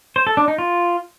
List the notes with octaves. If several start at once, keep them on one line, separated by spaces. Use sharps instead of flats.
C5
A4
D4
D#4
F4